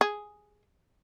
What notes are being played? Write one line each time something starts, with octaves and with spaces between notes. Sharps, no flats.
G#4